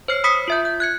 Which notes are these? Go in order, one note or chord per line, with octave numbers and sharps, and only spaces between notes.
C5 C#5 F6 C7
B5 D#6 E6 B6 C#7
F4 E5 G6
G6
F#6 G#6 C#7